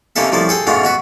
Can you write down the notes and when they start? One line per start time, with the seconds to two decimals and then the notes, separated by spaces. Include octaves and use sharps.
0.16 C3 A#3 C#4 D#4 A4 E5
0.32 C2 F#2 F3 A3 A#3 D6
0.49 G#4 A4 G5
0.67 G#2 B2 A3 B3 C#4 F4
0.84 B2 F#4 B4